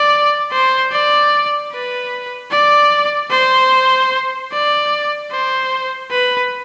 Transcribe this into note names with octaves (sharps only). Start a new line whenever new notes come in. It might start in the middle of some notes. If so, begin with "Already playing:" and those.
Already playing: D5
C5
D5
B4
D5
C5
D5
C5
B4